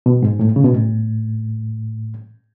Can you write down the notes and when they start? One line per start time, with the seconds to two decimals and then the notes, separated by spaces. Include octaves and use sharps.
0.06 B2
0.23 G#2
0.39 A2
0.56 C#3
0.65 B2
0.73 A2